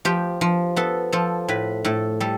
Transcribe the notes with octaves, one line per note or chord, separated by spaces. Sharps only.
F3 G4
F3
B3 A4
F3 A4
A2 B4
A2 A4
G3 A4